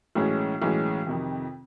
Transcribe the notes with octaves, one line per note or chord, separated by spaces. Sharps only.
B1 A2 E3 G#3 C#4
B1 A2 E3 G#3 C#4
F2 C3 D#3